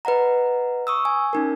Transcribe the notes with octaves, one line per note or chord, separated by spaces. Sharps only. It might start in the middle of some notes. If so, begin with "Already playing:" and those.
B4 D#5 F#5 A#5
C#6 D#6 E6
G#5
C#4 D#4 A#4